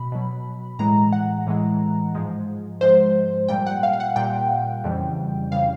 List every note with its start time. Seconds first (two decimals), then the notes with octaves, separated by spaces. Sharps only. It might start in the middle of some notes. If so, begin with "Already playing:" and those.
Already playing: B2 B5
0.12 B2 F#3
0.79 A2 E3 G#3 A#5
1.12 F#5
1.47 A2 E3 G#3
2.15 G#2 F3 G#3
2.81 G#2 F3 G#3 C5
3.48 A#2 G3 G5
3.66 F#5
3.83 F5
3.93 F5
4.00 F#5
4.16 A#2 G3 G5
4.84 F2 C#3 E3 G3
5.51 F2 C#3 E3 G3 F5